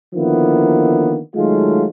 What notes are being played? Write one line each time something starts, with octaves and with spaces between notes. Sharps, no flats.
D3 D#3 F3 A#3 B3 E4
D#3 F#3 G#3 A3 F4